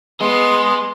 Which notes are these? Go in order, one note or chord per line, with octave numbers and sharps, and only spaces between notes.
B3 G#4 D#5 C6